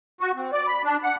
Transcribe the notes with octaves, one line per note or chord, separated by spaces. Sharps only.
F#4
C4
D5
B5
D4
F#5